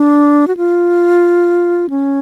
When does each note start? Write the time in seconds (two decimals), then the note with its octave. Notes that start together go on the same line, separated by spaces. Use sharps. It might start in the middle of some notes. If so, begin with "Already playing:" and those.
Already playing: D4
0.48 F#4
0.57 F4
1.90 C#4